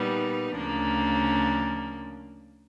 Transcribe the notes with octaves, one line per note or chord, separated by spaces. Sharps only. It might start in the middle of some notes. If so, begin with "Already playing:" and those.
Already playing: A#2 G3 B3 D#4
D2 C#3 F3 A#3 D4